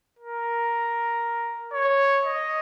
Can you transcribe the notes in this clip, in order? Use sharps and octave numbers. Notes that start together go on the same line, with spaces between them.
A#4
C#5
D#5